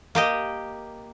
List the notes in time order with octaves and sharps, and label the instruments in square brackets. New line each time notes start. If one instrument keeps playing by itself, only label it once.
[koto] A#3 G4 D#5